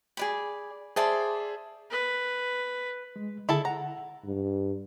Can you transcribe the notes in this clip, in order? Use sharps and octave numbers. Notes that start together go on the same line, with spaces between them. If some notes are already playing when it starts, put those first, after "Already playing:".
G#4 D5 B5
G#4 C5 D5 E5 A5 C6
B4
G#3
D3 E4 G#4 A4 A5
F#5 A#5
G2